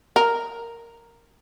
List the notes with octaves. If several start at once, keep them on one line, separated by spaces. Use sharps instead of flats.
A#4